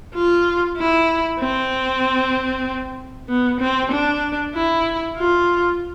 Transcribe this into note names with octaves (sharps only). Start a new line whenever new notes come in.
F4
E4
C4
B3
C4
D4
E4
F4